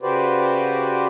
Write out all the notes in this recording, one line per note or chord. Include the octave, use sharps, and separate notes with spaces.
C#3 F#4 G4 B4 C5 D5